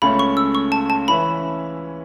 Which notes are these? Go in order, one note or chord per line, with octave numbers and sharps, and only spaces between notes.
C#2 C#3 A3 C#4 B5
C#6
E6
C#6
A5
A5
E3 C#4 E4 B4 E5 B5